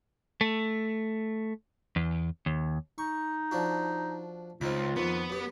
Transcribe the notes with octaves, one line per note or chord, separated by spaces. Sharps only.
A3
E2
D#2
D#4 C#6
F3 D4 F#4
C#2 C4 D#4 F4 B5
F2 D#3 B3
F#2 G4